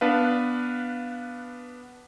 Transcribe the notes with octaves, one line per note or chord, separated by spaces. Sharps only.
B3 D4 B4 F5